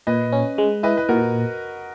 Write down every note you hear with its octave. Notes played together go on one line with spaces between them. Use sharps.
A#2 B4 D#5
C#4
G#3
E4 B4 D#5
B4
A#2 F#4 A#4